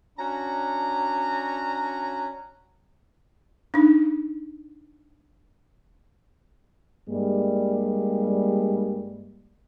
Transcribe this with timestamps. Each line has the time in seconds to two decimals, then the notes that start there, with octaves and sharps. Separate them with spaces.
0.18 C#4 D4 F#4 A#5
3.74 D4 D#4
7.10 G2 G3 G#3 A#3